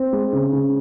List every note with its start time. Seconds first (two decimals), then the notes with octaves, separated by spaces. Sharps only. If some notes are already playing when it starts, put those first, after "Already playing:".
Already playing: C4
0.13 G#3
0.33 C#3
0.53 C#3